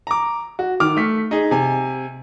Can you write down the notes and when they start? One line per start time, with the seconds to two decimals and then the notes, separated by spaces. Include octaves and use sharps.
0.07 A#5 D6
0.59 F#4
0.80 D#3 D6 F6
0.97 A3 B6
1.31 D#4 G#4
1.51 C3 G#5